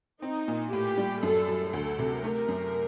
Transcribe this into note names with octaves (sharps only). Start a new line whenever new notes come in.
C4 D#4
A#2
A2 G4
G3
F#2 A4
F#3
D2 A4
C3
A3 A#4
F#2